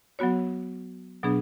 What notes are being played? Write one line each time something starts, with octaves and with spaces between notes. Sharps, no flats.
F#3 B3 F#4 C#5
B2 F#3 B3 D4 G#4